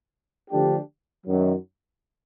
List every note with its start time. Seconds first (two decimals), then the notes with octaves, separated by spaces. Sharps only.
0.50 D3 F3 A3 D4 G4
1.27 F#2 D#3 F#3